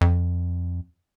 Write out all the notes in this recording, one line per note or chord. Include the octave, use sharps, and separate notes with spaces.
F2